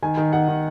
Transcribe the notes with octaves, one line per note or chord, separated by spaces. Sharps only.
D#3 G#5
D#3
D#3 F#5
D#3